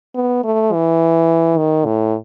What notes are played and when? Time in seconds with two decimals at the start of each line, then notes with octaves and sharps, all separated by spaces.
0.15 B3
0.44 A3
0.73 E3
1.57 D#3
1.85 A2